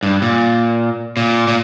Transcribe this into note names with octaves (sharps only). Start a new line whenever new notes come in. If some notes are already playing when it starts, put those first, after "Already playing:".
G2
A#2
A#2
A#2